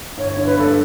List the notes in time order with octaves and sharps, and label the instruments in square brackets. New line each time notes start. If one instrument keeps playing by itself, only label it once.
[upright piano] G1 [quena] C#5
[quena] C#5
[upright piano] D3
[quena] B4
[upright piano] G2 [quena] A4